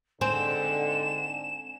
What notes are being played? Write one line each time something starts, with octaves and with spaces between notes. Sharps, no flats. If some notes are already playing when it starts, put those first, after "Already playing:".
G#2 D3 C4 G#5 E7